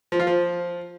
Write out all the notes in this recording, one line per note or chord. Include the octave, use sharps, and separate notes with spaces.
F3
F4
F3